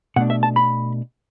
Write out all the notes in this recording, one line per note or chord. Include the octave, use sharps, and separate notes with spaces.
B2 A3 D4 F#5
E5
A5
B5